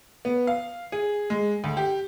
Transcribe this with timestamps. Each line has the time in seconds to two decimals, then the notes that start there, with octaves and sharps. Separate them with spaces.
0.25 B3
0.47 F5
0.92 G#4
1.30 G#3
1.64 D2
1.77 G4